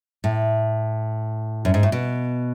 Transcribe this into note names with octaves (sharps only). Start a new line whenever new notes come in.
A2
F#2
G#2
A2
B2